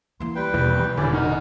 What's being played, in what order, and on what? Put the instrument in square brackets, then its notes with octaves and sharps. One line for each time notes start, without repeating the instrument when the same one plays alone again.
[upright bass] E3 A#3 [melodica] C6
[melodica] G3 B4 G5
[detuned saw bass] E2 [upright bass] B2
[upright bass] E1 A#2 [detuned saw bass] D3 [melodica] C#4 E4 D5
[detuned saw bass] D#4 [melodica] F#4 A#4